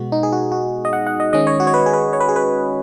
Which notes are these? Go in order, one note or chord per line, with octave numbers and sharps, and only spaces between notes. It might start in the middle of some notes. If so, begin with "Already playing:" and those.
Already playing: B2 G#3 B3 F#4
D#4
G#4
F#4
F#4
D#5
F#5
F#5
D#5
D#3 G#3 C#4 D#5
C#5
F#4
C#5
B4
G#4
B4
C#5
B4
G#4
B4